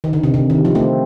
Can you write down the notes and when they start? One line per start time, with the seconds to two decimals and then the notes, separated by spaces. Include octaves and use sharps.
0.04 D#3
0.13 D3
0.24 C3
0.34 C3
0.50 D#3
0.65 F3
0.75 A3 C4